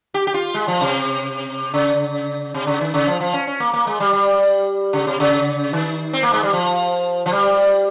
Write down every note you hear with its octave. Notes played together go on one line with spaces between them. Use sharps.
G4
G4
F4
G#3
F3
C3
C#3
C3
C#3
D#3
C#3
F3
F3
C#4
C#4
A#3
A#3
G#3
G3
G3
C#3
C3
C#3
D#3
C4
A#3
G#3
G3
F3
F3
G3